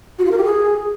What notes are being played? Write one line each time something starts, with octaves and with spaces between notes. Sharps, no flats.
F#4
F4
A#4
G4
G#4